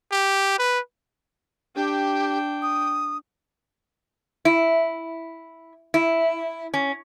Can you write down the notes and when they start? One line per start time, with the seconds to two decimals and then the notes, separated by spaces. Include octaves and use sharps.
0.12 G4
0.59 B4
1.76 D4 G4 G5
2.62 D#6
4.45 E4
5.94 E4
6.74 C#4